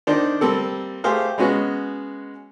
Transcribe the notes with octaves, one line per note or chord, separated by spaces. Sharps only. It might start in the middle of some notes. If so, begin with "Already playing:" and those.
D#3 D4 C5
G3 A#3 C4 A4
A3 G4 G#4 C5 F5
G#3 B3 C#4 F#4